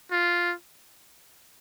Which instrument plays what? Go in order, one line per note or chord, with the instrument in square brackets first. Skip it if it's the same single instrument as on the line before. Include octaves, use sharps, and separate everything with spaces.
[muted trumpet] F4